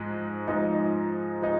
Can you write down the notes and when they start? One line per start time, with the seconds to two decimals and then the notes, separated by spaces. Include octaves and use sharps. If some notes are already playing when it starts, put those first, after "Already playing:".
Already playing: G#2 F3 G#3 D#4
0.48 G#2 F3 G#3 D#4
1.42 F3 G#3 D#4